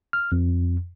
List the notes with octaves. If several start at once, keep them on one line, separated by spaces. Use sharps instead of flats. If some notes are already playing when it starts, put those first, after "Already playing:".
F6
F2